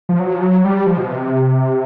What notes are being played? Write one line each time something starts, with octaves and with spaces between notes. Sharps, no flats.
F3
F#3
F3
F#3
G3
F3
B2
C3